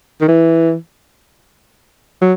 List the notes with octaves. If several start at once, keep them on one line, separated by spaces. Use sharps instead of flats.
D#3
E3
F#3